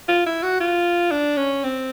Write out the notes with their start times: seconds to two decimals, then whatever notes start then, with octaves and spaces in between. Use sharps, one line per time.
0.09 F4
0.26 E4
0.43 F#4
0.61 F4
1.12 D4
1.37 C#4
1.64 C4